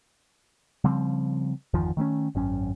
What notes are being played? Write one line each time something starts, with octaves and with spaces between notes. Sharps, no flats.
C#3 F3 G3 C4
G1 E2 D#3 F3
D#3 A3 B3 C#4
G#1 F#2 C#4